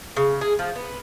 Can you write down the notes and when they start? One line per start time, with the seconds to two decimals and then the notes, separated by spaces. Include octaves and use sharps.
0.16 C#3
0.41 G#4
0.59 F3
0.76 B3